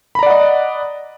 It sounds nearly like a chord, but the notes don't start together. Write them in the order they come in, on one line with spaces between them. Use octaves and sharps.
B5 A#5 D5 F#5 D#5